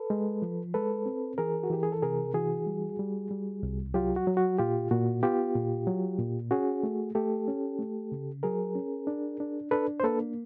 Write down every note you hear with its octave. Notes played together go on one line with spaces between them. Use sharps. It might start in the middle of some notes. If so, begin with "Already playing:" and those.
Already playing: A4 B4
G#3
F3
G#3 A4 B4
C4
E3 G#4 A#4
F#4
E3 G4
G#4
A4
C3 G#4 A#4
E3 F#4 G#4
G3
G3
G3
C2
F#3 F4 G4
F#4
F#3
F#4
A#2 F4 G4
A#2 F#4
B3 F4 G4
A#2
F#3
A#2
C#4 F#4 G#4
A3
A3 G4 A4
C#4
A3
C#3
F#3 G#4 A#4
C#4
D4
D4
D4 A4 B4
C5
A#3 A4 B4